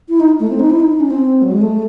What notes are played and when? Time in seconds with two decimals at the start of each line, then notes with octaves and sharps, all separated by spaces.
0.09 E4
0.20 D#4
0.40 A3
0.50 C4
0.60 D#4
0.70 E4
0.80 D#4
0.90 D#4
1.00 C#4
1.10 C4
1.42 F#3
1.52 G#3
1.62 A3